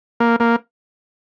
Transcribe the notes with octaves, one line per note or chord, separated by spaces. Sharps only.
A#3
A#3